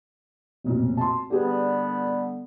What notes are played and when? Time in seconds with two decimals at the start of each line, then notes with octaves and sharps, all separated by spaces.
0.64 F1 B1 A#2
0.97 A5 C6
1.31 D3 G3 B3 G4 G#4 B4